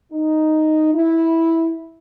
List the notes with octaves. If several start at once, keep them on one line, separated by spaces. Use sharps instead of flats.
D#4
E4